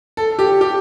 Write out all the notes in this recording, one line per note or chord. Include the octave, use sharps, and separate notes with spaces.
A4
G4
G4